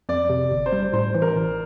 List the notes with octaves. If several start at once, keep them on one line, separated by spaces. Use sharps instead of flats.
F2 D5
C3
G1
C5
G3
A2 C5
E3
A#4
A1